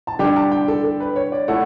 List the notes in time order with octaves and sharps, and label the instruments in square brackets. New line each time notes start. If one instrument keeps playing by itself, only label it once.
[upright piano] A5
[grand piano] D3 G3 D4 G4 [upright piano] G5
[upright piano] A5
G5
A4
A4
B4
C#5
D5
[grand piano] A3 E4 A4 C#5 [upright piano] F#5